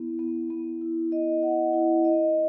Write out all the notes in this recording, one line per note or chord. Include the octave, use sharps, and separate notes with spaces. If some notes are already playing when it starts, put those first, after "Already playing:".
Already playing: B3 E4
B3
B3
E4
D#5
F#5
E4
D#5